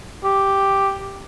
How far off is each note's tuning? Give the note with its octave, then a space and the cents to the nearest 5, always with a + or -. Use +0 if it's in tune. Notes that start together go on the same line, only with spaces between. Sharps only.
G4 +0